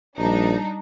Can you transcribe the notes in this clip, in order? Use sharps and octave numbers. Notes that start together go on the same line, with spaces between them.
A#1 G3 D4 D#4